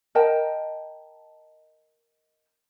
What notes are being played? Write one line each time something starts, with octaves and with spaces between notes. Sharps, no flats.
A#4 D#5 G5 A5